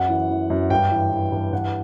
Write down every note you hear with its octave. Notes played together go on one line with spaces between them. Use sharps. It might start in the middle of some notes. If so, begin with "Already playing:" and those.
Already playing: F#2 F#5
E3
E3
F#2
G2 G5
E3
E3
G2
G2 F#5